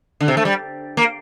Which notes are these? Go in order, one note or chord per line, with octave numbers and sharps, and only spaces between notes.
D3
C3
A3
G3
A#3